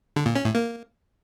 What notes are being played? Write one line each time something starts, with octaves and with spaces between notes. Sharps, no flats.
D3
A#2
C#4
A2
A#3